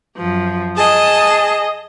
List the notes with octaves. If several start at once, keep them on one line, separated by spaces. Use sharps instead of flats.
F#2 F3
G#4 D#5 A5